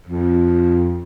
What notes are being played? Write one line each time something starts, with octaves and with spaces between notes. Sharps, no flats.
F2